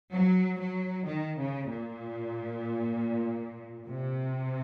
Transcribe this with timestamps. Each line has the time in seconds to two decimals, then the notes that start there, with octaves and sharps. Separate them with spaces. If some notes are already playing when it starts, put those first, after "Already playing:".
0.13 F#3
0.59 F#3
1.07 D#3
1.39 C#3
1.70 A#2
3.88 C3